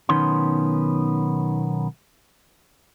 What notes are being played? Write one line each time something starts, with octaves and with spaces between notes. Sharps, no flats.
B1 D#3 B3 C#4 C6